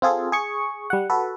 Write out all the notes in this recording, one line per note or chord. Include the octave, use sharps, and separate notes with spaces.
C4 F4 G#4 A4
G#4 C#6
G3 F#5
F#4 A4 B4